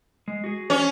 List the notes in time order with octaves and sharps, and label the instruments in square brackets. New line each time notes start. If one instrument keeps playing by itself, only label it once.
[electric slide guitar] G#3
F#4 G#4
[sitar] C#4